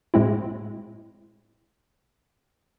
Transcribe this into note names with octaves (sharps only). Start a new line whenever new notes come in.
A2 G#3 C4 E4